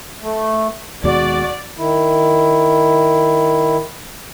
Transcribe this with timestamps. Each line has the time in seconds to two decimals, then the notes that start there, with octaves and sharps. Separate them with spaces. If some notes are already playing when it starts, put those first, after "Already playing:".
0.21 A3
1.04 D#2 B2 G#3 F#4 D5
1.78 D#3 E4